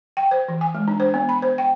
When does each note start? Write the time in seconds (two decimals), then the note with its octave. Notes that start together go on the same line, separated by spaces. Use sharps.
0.17 G5
0.31 C5
0.48 E3
0.61 G#5
0.74 G#3
0.88 D4
1.00 C5
1.14 B3
1.29 B5
1.42 C5
1.58 G5